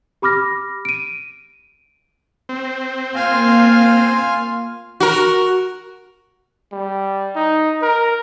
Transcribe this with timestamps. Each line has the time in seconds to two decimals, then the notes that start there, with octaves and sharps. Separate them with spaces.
0.22 G4 B5 D6 F6 A#6
0.85 D7 D#7
2.49 C4
3.15 A#3 F4 F5 G#5
5.00 F#4 A#4
6.72 G3
7.36 D#4
7.82 A#4